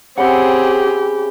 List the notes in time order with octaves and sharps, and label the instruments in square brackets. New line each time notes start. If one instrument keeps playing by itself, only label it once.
[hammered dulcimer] C#3 E4 C#5 [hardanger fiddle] C4 G#4 [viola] G4 [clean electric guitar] F#5